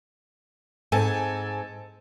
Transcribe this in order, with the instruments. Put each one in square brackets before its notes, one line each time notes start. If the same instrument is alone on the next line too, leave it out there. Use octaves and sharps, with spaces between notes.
[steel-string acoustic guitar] G#2 [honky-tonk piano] C4 A4 G#5